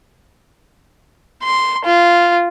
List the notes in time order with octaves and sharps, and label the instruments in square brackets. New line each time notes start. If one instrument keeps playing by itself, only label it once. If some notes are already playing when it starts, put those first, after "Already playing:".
[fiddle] C6
F4